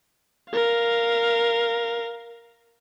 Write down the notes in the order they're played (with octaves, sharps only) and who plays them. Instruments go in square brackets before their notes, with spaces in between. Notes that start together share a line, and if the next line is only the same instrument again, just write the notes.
[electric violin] A#4 F5